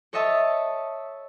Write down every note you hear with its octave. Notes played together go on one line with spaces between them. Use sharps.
A4 C#5 D#5 E5 A5